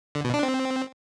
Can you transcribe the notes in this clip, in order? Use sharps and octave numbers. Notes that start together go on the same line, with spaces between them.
D3
B2
D4
C4